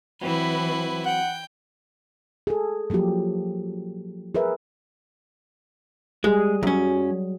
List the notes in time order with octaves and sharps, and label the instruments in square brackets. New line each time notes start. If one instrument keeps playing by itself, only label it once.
[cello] E3 [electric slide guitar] F#3 C4 [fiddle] E4 B4
[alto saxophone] F#5 [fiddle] G5
[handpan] G#4 A4
F3 F#3 A#3 F4 G4
G#4 A#4 B4 E5
[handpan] G3 G#4 [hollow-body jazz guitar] G#3
[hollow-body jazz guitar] F#2 C#4 [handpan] F#3